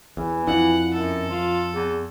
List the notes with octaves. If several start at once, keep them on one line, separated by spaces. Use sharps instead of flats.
E2 E3
F2 E4 F#5
F#2 A4
F3 F4
E2